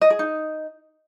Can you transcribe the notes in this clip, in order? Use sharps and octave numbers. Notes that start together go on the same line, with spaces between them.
D#5
G#4
D#4